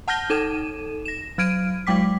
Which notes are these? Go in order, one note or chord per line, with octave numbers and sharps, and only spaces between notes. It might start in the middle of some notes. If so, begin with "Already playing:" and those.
F#5 A5 F6 G6 A#6 G7
D#4 A4 D#7 E7
A#6 E7
F#3 F6 G#6 D7 D#7
F#3 G#3 G5 D6 B6